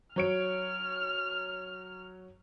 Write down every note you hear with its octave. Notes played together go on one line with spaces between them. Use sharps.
F#3 C#5 F6 D7